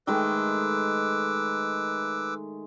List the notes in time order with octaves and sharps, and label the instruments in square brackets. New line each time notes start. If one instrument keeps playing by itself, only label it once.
[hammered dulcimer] D#3 G#3 A3 [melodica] B4 D6 E6